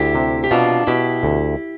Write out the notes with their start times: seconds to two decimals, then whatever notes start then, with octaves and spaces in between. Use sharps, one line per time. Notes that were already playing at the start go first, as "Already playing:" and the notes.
Already playing: D2 E4 G4
0.15 C3
0.44 G4
0.51 B2 D4 F4
0.87 B2 E4 G4
1.23 D2